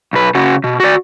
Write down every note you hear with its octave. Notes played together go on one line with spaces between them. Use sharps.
B1 B4
C#3 F#4
B2
F#4 D5